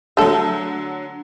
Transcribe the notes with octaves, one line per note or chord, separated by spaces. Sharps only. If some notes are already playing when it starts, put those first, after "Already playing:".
D3 F#3 A3 A4